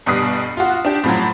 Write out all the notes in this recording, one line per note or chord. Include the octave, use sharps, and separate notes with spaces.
G1 B2 G3 D#6 C7
F4 F#4
D4 G4
A2 F3 F#3